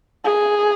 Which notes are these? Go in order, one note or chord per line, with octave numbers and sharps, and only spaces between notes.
G#4